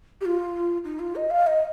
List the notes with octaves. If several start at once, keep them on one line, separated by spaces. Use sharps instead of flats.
G4
F4
D#4
F4
D#5
F5
D#5